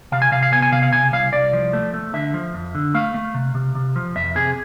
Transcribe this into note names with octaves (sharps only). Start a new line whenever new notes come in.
C3 F5
G#5
C3 F5
F5
B3 G#5
G#5
C3 F5
F5
C3 G#5
C2 F5
C2 D5
F3
A3
A3
D3 E5
F3
F2
D3
A3 F5
A3
C3
C3
C3
F3
F2 E5
C3 G#4